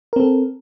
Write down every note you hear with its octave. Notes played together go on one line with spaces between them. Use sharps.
C4 A4 A#4